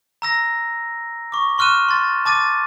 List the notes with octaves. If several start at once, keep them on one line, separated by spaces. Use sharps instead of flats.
A#5 E6 A#6
C#6 D6
C6 C#6 F6 F#6 D#7 E7
C6 A6
A5 D6 A6 D#7